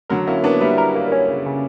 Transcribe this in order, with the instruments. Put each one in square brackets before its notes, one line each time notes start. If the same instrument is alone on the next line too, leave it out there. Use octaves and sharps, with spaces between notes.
[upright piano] D3 F#3 [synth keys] A#4
[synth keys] A#3 [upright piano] C#4 E4
[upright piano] B3 D4 [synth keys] D5
[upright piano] G3 B3 [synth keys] E4
[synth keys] A#4
A#3
C#4
C#3
C#3